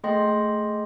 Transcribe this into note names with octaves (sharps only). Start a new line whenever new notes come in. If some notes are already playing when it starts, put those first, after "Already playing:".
A3 G#4 D#5 G5 C6 A#6